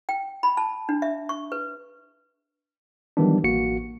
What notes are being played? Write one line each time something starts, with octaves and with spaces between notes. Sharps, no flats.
G5
B5
A5
D4
E5
C#6
B4
D#3 E3 F#3 G3 B3 D4
A1 A#3 F#4 C#7